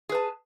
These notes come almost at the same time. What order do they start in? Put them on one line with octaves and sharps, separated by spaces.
G#4 B4 A5